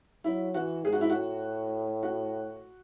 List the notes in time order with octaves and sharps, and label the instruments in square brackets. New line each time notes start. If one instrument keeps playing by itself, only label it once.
[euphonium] F#3 [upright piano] E4
[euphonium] E3 [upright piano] F#4
[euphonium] G#2 [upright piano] G#4
[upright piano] F#4
E4
[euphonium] A2 [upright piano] F#4
[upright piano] F#4